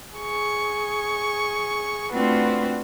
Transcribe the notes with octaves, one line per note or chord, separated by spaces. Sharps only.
G#4 C#6
A3 C4 D4 F4 F#4 B4